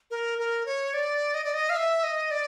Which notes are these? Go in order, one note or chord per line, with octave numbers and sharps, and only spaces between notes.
A#4
A#4
C#5
D5
D#5
D5
D#5
F5
E5
D#5
D5